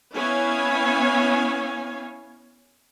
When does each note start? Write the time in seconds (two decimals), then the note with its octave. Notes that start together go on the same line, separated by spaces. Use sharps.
0.15 B3 C#4 E4 C#5 F5 G#5